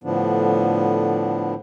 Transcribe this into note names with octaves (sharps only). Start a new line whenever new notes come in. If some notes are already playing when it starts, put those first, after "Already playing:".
A2 D3 F3 B3 D4